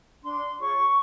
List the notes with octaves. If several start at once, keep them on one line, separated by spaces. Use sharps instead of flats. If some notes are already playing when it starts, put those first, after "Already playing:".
D4 C6
F4 G#4 C#5 C#6